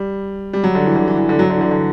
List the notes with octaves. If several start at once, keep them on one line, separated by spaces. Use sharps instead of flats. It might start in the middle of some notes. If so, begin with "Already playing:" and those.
Already playing: G3
G3
F#3
D3
E3
D3
E3
E3
D3
F#3
D3
E3
D3
D3